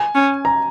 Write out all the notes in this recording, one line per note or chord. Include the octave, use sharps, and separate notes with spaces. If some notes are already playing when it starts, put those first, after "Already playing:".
Already playing: G#5
C#4
A#5